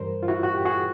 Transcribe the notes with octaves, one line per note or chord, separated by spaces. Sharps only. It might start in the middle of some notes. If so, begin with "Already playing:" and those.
Already playing: G2 E3 G3 A#4 C5
F4
E4 F#4
F#4
G4
F#4 G#4